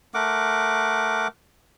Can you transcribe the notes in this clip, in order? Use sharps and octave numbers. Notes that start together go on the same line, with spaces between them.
A3 A#4 F#5 D6